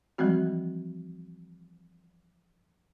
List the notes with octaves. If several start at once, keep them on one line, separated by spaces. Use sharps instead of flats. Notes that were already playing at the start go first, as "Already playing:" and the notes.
E3 F3 G3 G#3 C4 F#4